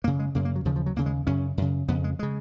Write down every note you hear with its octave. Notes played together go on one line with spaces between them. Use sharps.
F#2 C#3 A#3
G#3
F#2 C#3 A#3
A#3
F#3
D#2 C#3 F3
F3
F#3
D#2 C#3 A#3
G#3
F#2 C#3 C#4
F#2 C#3
F2 C#3 B3
G#3
C#3 G#3